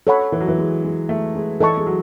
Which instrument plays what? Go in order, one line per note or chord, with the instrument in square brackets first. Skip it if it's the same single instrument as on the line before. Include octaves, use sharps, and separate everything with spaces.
[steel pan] A4 C#5 F#5 B5
[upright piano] E3
F#3
E3
G#3
G#3
A3
G#3
[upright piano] E3 [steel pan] A4 D#5 A5 C#6
[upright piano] G#3
F#3